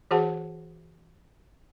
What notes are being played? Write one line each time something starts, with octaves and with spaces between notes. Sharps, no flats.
E3 F#4 G#4 C5 F#5 A5